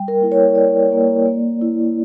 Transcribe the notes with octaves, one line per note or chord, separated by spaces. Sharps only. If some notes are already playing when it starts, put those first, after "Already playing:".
Already playing: G3 G5
A#4
A#3 E4
C#5
G3 D5
A#3 E4
A#3
E4